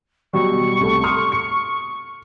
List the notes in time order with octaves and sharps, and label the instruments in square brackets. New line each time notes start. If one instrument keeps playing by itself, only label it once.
[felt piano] B2 F#3 G3 [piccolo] C#6
[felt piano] C2 A3
C6 D#6 F6
C#7